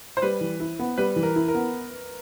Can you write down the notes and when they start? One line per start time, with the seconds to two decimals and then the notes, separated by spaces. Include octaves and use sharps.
0.17 C5
0.22 G3 B4
0.41 E3
0.60 E4
0.79 B3
0.97 G3 B4
1.16 E3
1.23 A#4
1.36 E4
1.48 A#4
1.54 B3